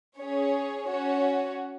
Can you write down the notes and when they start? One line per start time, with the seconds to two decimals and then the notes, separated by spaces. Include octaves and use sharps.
0.18 C#4 G#4 C#5
0.87 C#4 F#4 C#5